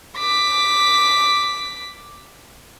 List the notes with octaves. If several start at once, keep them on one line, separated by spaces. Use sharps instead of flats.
D6 B6